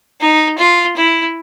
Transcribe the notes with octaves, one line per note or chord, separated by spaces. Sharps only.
D#4
F4
E4